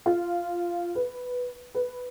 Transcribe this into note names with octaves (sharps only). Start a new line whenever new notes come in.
F4
B4
B4